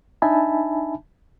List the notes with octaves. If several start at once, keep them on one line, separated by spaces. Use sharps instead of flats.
D4 D#4 E5 G#5 A5 B5